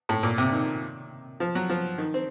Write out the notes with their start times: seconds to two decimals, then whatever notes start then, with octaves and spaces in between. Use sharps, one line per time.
0.09 A2
0.23 A#2
0.38 C3
0.52 D#3
1.40 F3
1.55 F#3
1.70 F3
1.98 D#3
2.14 C4